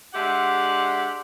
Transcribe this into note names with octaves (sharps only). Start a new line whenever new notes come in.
G#3 D4 G4 E5 F#5